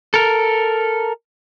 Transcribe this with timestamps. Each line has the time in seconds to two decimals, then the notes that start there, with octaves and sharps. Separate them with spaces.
0.14 A4 A#4